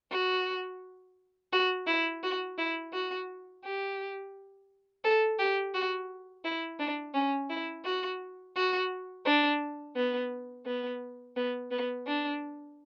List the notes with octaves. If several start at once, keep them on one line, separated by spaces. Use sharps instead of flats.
F#4
F#4
E4
F#4
E4
F#4
G4
A4
G4
F#4
E4
D4
C#4
E4
F#4
F#4
D4
B3
B3
B3
B3
D4